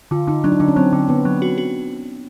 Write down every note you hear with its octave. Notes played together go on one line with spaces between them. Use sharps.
D3 F4
D3 D#4
F#3 D4
D#4
D3 D4
C#4
F#3 C4
D3
D3 B3
F#3
F#4
F#4